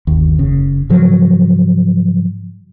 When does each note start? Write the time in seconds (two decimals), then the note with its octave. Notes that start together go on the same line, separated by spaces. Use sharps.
0.07 G1 D#2
0.39 F#1 C#3
0.90 G#2 C#3 F3 F#3